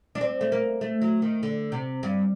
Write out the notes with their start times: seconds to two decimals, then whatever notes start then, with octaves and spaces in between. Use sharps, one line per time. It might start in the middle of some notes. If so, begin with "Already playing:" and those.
0.15 D4
0.21 C4
0.41 A3
0.52 A#3
0.81 A3
1.02 F#3
1.22 D#3
1.43 D3
1.72 C3
2.03 G2